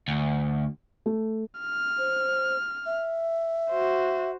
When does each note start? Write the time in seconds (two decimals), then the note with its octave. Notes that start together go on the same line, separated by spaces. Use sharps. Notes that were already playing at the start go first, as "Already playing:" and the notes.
0.08 D2
1.06 A3
1.60 F6
1.98 C5
2.86 E5
3.70 F#4 C5